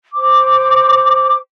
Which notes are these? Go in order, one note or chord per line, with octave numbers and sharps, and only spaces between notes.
C5 D6